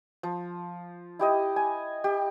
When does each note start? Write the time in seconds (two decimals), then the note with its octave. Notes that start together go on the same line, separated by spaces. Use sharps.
0.23 F3
1.19 E4 G4 D#5
1.56 G#5
2.04 G4